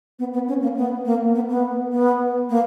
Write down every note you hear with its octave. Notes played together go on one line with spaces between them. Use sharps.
B3
B3
C#4
A#3
B3
A#3
B3
B3
B3
A#3